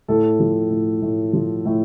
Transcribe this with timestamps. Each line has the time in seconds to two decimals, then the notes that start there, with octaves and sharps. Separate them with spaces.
0.08 A2 A4
0.40 F3
0.70 A2
1.02 A2
1.33 F3
1.65 A2